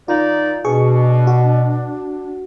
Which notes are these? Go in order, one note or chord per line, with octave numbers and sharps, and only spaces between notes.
D#3 D#4 F4 D5
B2 D4 G#4 C#6
F#4